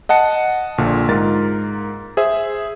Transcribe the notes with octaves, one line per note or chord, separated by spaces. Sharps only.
D#5 F#5 A5 C#7
A#1 A#2 D3
G#2 F4 A#4 A6
G#4 C5 E5